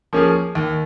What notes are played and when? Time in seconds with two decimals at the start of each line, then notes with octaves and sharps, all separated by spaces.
0.13 F3 A#3 C#4 G#4
0.55 D#2